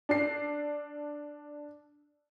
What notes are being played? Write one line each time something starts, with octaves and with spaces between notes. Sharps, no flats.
D4 C7